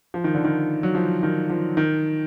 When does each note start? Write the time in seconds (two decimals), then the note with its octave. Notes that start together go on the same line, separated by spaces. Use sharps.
0.14 F3
0.24 D#3
0.34 D3
0.44 D#3
0.83 F#3
0.95 F3
1.23 D#3
1.50 F3
1.77 D#3